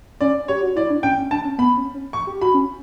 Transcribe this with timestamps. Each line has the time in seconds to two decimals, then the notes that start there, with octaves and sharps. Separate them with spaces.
0.21 C#4 D5
0.48 G4 C#5
0.62 F#4
0.76 E4 D5
0.90 D4
1.03 C#4 G5
1.18 C#4
1.31 D4 A5
1.44 C#4
1.58 B3 B5
1.77 C#4
1.94 C#4
2.13 C#6
2.27 G4
2.41 F#4 B5
2.54 C#4